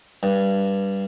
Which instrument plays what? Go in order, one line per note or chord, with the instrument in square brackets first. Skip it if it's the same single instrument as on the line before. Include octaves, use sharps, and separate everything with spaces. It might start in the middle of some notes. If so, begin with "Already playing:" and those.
[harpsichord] G2